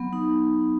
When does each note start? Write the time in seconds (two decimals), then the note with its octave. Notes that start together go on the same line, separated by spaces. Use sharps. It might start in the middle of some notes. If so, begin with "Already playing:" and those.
Already playing: F#3 B3
0.13 D#4